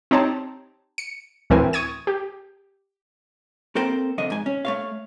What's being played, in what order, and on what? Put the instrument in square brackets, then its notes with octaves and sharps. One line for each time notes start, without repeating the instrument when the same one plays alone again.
[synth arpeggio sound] C4 D#4 G4 C#5 A5 A#5
C#7
D2 A2 E3 C4 A#4 G#5
C#6 D#6 G#6 D#7
G4
[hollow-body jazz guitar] A#3 C4 A4 A#4 C5 G5
F2 D3 D#5
G#2 G#5
C#4
A3 C#5 F5